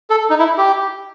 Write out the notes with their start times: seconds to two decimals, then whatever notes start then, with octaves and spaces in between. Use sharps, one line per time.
0.10 A4
0.30 D#4
0.39 E4
0.58 G4